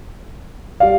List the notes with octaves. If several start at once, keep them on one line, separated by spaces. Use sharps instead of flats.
G3 D5 F5